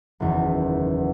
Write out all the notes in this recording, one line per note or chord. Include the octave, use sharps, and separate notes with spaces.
F#1 E2 D#3